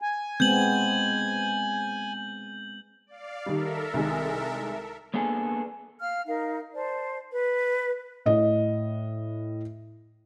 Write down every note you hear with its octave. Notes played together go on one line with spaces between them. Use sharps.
G#5
G#3 B3 C4 G6 F#7
D5 F5
D#3 G3 A4 A#4 E5
C2 D#3 G#3
A#3 B3 D4 G#4 A4
F5 F6
D#4 A#4 F5
C5 D5 A5
B4
A2 D#5